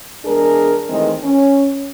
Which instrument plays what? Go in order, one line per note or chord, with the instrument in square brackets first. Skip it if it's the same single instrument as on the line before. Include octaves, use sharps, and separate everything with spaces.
[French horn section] E2 G#3 D4 G#4 A#4
D#3 E3 G#3 A3 C4
C#4